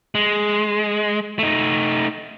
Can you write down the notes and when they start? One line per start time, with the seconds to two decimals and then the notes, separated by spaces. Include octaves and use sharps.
0.15 G#3
1.39 A3 D#4